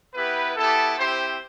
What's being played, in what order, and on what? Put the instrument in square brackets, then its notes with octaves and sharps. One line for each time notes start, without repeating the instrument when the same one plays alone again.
[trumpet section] B3 E4 G4 B4
B3 E4 G4 A4
C4 E4 G4 C5